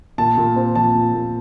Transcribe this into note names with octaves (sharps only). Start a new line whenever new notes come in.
A#2 A5
A#2
C4
F3 A5
A#2
A#2